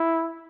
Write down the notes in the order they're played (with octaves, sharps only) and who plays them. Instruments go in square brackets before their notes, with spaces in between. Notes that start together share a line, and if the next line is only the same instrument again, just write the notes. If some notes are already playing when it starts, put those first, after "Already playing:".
Already playing: [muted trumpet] E4